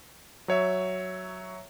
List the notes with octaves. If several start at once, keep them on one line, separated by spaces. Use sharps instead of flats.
F#3 C#5 E5